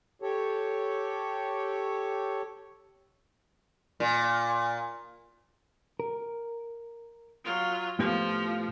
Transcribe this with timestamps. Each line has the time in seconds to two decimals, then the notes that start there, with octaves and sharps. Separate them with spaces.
0.22 G4 A4 C#5
4.00 A#2
6.00 A#4
7.44 F#3 F4
7.99 A2 F3 B3 G4